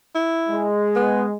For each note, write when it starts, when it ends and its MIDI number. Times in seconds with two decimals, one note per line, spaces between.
0.15 0.68 64
0.49 1.36 56
0.95 1.25 59